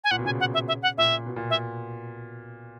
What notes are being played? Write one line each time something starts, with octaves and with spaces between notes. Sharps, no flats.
G#5
A#2 F#5
B2
C#3 G#5
F#5
E5
E5
F#5
A#2 E5
B2
A#2
E5